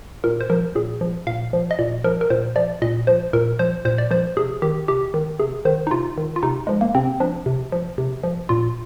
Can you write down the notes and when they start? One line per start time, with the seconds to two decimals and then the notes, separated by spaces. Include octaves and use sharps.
0.24 A#2 A#4
0.41 C5
0.50 F3 A#4
0.75 A#2 G#4
1.01 F3
1.27 A#2 F5
1.53 F3
1.71 D#5
1.79 A#2 D5
2.04 F3 A#4
2.21 A#4
2.30 A#2 C5
2.56 F3 D5
2.82 A#2 D#5
3.07 F3 C5
3.33 A#2 A#4
3.59 F3 C5
3.85 A#2 C5
3.98 D5
4.11 F3 C5
4.37 C3 G#4
4.62 D#3 G4
4.88 C3 G4
5.14 D#3
5.40 C3 G#4
5.65 D#3 C5
5.87 D#4
5.91 C3 F4
6.18 D#3
6.36 F4
6.43 C3 D#4
6.67 F3 G#3
6.81 A#3
6.95 C3 C4
7.20 F3 D4
7.46 C3
7.72 F3
7.98 C3
8.24 F3
8.49 A#2 F4